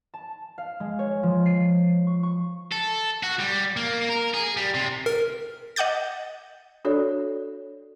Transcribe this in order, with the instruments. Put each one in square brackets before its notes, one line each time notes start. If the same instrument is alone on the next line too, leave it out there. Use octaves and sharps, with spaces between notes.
[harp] A5
F5
G#3
C#5
F3
C7
C7
C#6
C#6
[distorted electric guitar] A4
F#4
G3
A#3
A#4
G#4
G3
C3
[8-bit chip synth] A#4
[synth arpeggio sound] D#5 F#5 D6 G6 A6
[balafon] D4 F#4 A4 C#5 D5